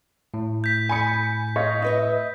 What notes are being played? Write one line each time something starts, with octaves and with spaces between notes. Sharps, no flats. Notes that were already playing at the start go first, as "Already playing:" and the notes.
A2
G6 B6
G#5 B5 C#7
C#5 D#5 F5
E4 B4 D#5 E5